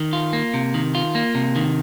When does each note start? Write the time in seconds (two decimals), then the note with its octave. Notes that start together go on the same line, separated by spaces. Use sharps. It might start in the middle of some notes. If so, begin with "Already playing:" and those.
Already playing: D#3
0.13 F4
0.33 A#3
0.54 C3
0.74 D#3
0.95 F4
1.15 A#3
1.35 C3
1.56 D#3